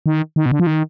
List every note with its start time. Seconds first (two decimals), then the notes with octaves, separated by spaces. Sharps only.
0.06 D#3
0.36 D#3
0.46 B2
0.52 D3
0.60 F3
0.67 D#3